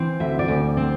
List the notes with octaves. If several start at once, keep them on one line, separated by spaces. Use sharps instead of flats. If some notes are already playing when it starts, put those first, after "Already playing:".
Already playing: E3 C4
D2 E5
D5
D2
C4